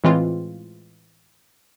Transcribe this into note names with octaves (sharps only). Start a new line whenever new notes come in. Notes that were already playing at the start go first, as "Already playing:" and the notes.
A2 E3 G#3 C4 F4